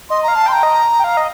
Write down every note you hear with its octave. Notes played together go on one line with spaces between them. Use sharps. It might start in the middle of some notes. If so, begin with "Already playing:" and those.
D#5 C6
A#5
F5
A5
G5 C6
A#5
D#5
G5
F5
D#5